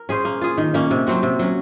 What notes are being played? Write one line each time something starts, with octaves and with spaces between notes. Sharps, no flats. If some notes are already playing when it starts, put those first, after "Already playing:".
Already playing: A#4
C#4 G#4 C5
A#3
F4 G#4
D#3
A#3 C#4
C3
F#3 C4 F#4
C3
F#3 C#4